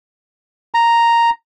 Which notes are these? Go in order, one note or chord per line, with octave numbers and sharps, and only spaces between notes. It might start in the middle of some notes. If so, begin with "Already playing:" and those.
A#5